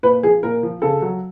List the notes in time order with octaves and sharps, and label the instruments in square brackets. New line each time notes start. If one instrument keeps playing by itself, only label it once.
[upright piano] A#2 B4
F3 G#4
A#2 A#4
F3
C#3 A4
F#3